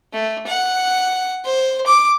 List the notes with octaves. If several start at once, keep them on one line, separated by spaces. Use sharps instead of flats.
A3
F#5
C5
D6